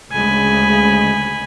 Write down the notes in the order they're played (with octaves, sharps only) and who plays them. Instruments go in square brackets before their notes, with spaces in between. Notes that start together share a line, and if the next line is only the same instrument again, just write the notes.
[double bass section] D2 C#3 G#3 [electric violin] G#5 B5